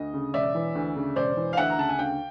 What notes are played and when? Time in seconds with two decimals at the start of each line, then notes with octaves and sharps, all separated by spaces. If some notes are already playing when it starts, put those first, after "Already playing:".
Already playing: D2 D#5
0.14 C#3
0.34 E1 D5 E5
0.55 E3
0.75 D2
0.96 C#3
1.16 E1 C5 D5
1.37 E3
1.53 F5
1.57 D2 E5 F#5
1.70 A#5
1.78 C#3 A5
1.89 G#5
1.98 D2 F5 G5